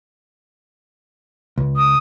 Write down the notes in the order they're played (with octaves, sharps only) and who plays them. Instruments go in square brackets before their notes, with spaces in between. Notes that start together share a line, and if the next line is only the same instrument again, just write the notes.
[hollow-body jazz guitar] C#2
[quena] D#6